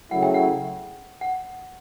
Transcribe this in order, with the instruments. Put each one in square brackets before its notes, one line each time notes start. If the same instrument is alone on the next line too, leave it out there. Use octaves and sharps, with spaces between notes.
[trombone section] C#3 F#3 A3 E4 [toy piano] F#5
[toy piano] G5
F#5
F#5